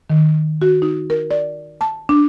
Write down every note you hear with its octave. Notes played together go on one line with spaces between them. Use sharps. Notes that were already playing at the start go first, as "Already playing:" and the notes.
D#3
F#4
D#4
A#4
D5
A5
D4